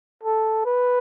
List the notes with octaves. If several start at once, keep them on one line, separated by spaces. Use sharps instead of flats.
A4
B4